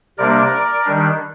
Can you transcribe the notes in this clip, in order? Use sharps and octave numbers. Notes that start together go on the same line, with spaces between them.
C3 G3 A#3 D4 A#4 D5
D#3 G3 D4